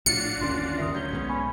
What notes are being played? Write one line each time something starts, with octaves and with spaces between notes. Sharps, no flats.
A#1 A2 D4 F4 F#4 C#7
G1 D#2 C#4 D5 C6
F#1 D#2 D#3 A#4 E5 D#6
D2 F#3 C#4 G6 G7
B1 G#2 B3
G#5 B5 C#6